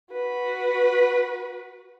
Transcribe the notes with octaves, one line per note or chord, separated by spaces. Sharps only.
F#4 B4